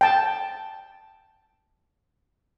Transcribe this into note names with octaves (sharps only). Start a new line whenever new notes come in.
G5 A5